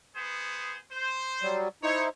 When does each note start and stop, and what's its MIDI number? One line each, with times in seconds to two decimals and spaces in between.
0.16 0.75 59
0.16 0.75 68
0.16 0.75 72
0.92 1.55 72
1.42 1.68 54
1.42 1.68 55
1.83 2.09 63
1.83 2.09 64
1.83 2.09 72
1.83 2.04 73